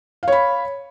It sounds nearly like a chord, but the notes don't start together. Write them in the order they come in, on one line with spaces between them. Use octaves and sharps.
F5 C#5 B5